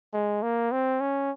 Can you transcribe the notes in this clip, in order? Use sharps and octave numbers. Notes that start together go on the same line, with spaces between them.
G#3
A#3
C4
C#4